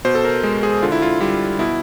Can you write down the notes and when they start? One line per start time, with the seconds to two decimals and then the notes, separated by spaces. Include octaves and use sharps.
0.05 B2 C5
0.15 A4
0.24 A#4
0.44 G#3
0.63 G#4
0.82 D3 F4
0.92 E4
1.02 F4
1.21 G3 E4
1.59 B2 E4